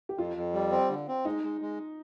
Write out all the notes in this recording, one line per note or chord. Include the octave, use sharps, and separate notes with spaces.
G4
F2 F4
F2
G3
C4
D3
C4
G#3 D#4
G#3
G#3